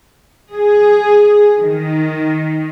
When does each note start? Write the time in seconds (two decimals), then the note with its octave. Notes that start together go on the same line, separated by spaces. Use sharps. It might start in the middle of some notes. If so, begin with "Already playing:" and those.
0.54 G#4
1.60 D#3